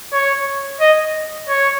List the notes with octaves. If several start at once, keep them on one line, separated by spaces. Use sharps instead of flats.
C#5
D#5
C#5